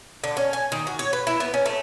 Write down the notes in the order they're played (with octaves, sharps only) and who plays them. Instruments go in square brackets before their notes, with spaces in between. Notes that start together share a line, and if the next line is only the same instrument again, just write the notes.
[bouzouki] D3
C#4
G#5
D#3
F#4
C#5
B4
E4
B3
C#4
A3